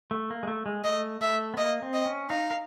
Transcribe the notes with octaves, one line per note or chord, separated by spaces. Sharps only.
A3
A#3
G#3
A3
G#3
A3 D#5
A3 E5
B3
A#3 D#5
C4
D#5
C#4
D#4 F5
A#4